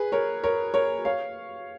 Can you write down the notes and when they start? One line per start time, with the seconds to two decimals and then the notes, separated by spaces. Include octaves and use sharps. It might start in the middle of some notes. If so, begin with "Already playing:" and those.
Already playing: G#4 B4
0.12 A#4 C#5
0.43 A#4 C#5
0.74 A#4 C#5
1.05 C#5 F5